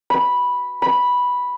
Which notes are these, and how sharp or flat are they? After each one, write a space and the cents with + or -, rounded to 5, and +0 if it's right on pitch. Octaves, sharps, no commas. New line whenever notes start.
B5 -5
B5 -5